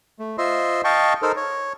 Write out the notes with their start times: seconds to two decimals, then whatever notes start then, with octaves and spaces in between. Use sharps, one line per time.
0.19 A3
0.38 F4 C5 D#5 E5 C6
0.84 D#5 F5 G5 A5 C#6
1.22 D#4 A4 A#4 C5
1.36 C#5